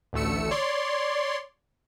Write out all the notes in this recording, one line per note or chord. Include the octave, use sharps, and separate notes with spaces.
A1 D2 A3 E6 C#7
C#5 D5 C6